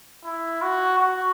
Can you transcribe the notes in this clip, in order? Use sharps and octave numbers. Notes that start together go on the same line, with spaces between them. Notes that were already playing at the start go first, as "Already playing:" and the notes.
E4
F#4
F#4